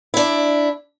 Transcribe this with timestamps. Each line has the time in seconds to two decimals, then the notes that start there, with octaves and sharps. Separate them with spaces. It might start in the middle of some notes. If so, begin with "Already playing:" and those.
0.14 D4 E4